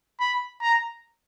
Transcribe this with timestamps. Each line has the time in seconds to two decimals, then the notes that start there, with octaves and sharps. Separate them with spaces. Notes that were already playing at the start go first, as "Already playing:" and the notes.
0.20 B5
0.62 A#5